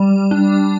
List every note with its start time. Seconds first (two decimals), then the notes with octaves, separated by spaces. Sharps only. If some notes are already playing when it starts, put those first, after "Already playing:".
Already playing: G3
0.31 D4